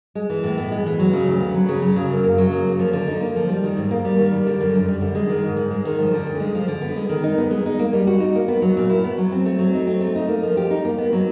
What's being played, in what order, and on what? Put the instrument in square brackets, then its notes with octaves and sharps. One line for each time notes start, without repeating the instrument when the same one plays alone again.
[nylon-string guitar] G#3
E3
A2
B3
G#3
E3
F#3
C#3
D2
B3
F#3
C#3
F#3
C#3
F#2
A#3
F#3
C#3
A#3
F3
D3
D#4
A#3
F3
G3
D#3
G#2
A#3
G3
D#3
G3
D3
F#2
F#2
G3
D3
G#3
D#3
G#2
G#2
G#3
D#3
F3
D3
D2
G#3
F3
D3
B3
G#3
D#3
D#4
B3
G#3
D#4
A#3
G3
F#4
D#4
A#3
B3
F#3
A#2
E4
B3
F#3
C4
A3
F#3
D#4
C4
A3
D#4
A#3
F3
G4
D#4
A#3
B3
F#3